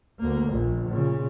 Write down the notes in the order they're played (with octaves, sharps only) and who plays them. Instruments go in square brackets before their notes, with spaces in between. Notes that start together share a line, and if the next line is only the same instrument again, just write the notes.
[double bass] D2 A#3
A#1
A#2 C#3